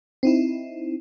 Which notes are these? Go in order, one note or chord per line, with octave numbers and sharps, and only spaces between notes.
C4 D#4 E4